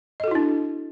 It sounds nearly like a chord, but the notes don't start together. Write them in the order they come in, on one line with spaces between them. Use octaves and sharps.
D#5 A4 F#4 E4 D4